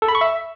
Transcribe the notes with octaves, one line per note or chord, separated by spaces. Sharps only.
A4
B5
C#6
E5